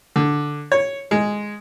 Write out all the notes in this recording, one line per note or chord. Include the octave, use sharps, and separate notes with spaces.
D3
C#5
G#3